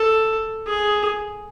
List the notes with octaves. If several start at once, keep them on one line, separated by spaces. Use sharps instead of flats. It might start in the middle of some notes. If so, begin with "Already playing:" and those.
Already playing: A4
G#4